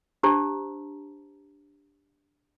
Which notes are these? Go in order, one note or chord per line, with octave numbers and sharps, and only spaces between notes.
D4 G4 C5 A5 A#5